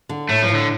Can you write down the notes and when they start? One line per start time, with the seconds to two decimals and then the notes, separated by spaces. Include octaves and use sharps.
0.09 D3
0.29 A2 A3
0.43 G2 F3
0.49 A2
0.55 D3